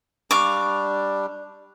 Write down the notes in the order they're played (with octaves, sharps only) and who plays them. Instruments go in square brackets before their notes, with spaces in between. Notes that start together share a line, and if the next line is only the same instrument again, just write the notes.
[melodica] G3 D4 [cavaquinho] F5 C#6 D6